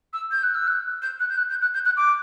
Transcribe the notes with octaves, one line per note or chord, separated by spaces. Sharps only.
E6
G6
F#6
E6
F#6
G6
F#6
G6
F#6
G6
F#6
G6
F#6
D6